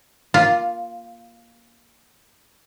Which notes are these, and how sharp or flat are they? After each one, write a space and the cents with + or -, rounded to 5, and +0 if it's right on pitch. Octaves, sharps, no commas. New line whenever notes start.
A#3 +15 F4 +0